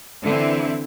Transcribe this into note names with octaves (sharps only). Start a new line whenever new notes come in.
D3 E3 C4 E4